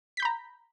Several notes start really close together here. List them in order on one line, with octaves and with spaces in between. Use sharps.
B6 G6 B5 A#5